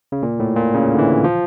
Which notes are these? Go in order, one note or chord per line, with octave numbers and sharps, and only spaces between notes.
C#3
A#2
A2
A#2
C#3
D3
E3
F3